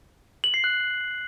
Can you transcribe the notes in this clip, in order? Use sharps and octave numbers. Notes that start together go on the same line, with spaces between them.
F#7
C7
F#6